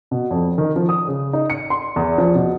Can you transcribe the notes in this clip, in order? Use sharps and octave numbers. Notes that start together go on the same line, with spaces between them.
B2
F2
D#3
F3
D#6
C#3
D#4
C#7
C6
E2
F3
B2